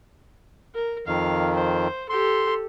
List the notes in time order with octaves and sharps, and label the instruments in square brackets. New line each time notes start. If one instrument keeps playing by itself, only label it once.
[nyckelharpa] A#4
[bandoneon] F2 D#3 [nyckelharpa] F5
[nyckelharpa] C5
[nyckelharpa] G4 A4 [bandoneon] C6